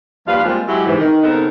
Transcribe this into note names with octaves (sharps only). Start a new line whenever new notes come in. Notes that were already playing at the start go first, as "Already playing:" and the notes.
D#2 F3 G3 B4 F5
G3 G#3 A#3 C4 F4
F#3 G#3 E4 G4
G#2 C3 E3
D#3
C#3 B3 C4 D#4 A4 A#4